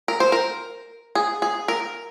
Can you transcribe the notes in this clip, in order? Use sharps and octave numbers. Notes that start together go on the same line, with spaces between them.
A#4
C5
A#4
G#4
G#4
A#4